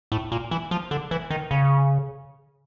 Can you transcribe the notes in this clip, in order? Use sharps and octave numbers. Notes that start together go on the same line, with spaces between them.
A2
A#2
E3
F3
D3
E3
D#3
C#3